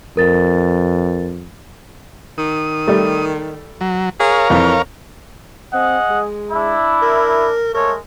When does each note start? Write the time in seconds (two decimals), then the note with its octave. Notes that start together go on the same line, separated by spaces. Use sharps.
0.17 F2 A#4 A6
2.38 D#3 D#6
2.88 G3 A3
3.81 F#3
4.20 G#4 A#4 C#5 F5
4.50 F2 E3
5.74 C4 G#4 D#5 F#5
6.10 G#3
6.52 D4 E4
7.02 A#4
7.74 G#3 A3 A#4 C#5